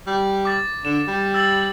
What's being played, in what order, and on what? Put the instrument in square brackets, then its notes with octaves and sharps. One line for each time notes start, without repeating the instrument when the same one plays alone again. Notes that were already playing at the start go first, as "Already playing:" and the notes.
[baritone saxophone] G3
[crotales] D6 A6
[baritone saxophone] D3 [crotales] E7
[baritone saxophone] G3
[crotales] E6 A6 F#7